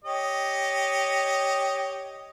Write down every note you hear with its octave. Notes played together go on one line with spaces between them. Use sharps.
G4 C#5 D#5